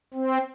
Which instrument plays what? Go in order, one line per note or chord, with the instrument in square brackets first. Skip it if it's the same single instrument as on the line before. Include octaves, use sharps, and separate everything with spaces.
[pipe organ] C4